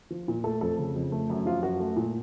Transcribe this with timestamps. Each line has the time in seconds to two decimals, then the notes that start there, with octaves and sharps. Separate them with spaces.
0.10 F3
0.28 A#2
0.44 A3 A4
0.61 F2 A4
0.79 C#3
0.95 F2
1.12 A3
1.30 F#2
1.46 F3 F4
1.63 F#2 F#4
1.80 A3
1.96 A#2